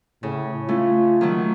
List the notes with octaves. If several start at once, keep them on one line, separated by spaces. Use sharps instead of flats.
A2 C#3
A3 C#4 F4
D#3 F#3 A3